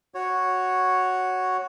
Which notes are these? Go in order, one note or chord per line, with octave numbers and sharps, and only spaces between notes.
F#4 C#5